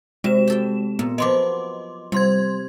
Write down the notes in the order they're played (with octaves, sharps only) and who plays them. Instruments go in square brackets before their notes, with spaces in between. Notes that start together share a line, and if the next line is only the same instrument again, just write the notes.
[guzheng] C3 [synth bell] G#3 F#4 E7
[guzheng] G4 A4 G5
[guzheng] A#2 [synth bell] B3
[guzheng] F3 F#3 B3 [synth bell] D#5 C6 D6
[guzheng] C3 [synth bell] G3 C6 G#6